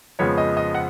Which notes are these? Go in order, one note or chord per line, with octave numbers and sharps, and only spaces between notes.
F2 C#3 F3 G#3 B3 C#5
D#5
D#5
F#5